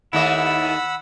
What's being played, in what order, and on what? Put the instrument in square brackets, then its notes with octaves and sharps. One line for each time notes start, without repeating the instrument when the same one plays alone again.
[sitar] D#2 A3 D#5 [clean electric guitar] E4 [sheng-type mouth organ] F#5 B5 E6